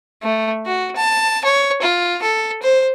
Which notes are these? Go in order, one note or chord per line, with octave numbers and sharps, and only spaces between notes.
A3
F#4
A5
C#5
F4
A4
C5